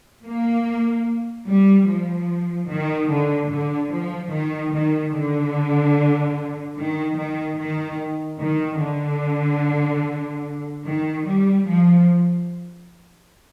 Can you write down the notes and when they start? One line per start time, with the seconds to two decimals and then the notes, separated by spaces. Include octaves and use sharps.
0.24 A#3
1.46 G3
1.87 F3
2.69 D#3
3.10 D3
3.50 D3
3.91 F3
4.31 D#3
4.73 D#3
5.14 D3
6.77 D#3
7.17 D#3
7.58 D#3
8.40 D#3
8.80 D3
10.85 D#3
11.25 G3
11.66 F3